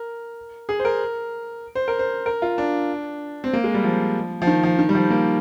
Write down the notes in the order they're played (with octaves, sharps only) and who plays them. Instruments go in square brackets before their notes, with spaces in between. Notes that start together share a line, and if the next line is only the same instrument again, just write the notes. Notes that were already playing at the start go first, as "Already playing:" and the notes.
Already playing: [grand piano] A#4
G#4
C5
A#4
C5
A#4
C5
A#4
F4
D4
C4
A#3
G#3
G3
F3
F3
D#3
F3
D#3
G3
F3
A#3